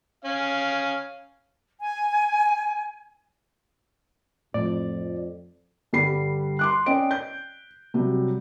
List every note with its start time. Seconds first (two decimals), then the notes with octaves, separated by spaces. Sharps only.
0.24 C#4 F5
1.80 G#5
4.54 F2 A2 D5
5.93 G2 D3 G3 B5 C7
6.59 C6 D6 F#6
6.86 C#4 D5 D#5 G5 D7
7.11 G6
7.94 C3 F#3 G3